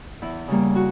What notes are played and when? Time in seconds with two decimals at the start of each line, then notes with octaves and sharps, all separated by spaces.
0.22 E2 E4
0.48 C#3 G3 A#3
0.76 F#4